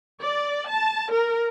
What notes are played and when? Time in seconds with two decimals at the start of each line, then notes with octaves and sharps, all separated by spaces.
0.22 D5
0.68 A5
1.11 A#4